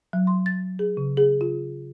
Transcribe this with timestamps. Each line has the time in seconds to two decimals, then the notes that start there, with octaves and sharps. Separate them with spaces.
0.13 F#3
0.27 C6
0.46 A6
0.79 G#4
0.97 C#3
1.17 G#4
1.41 F4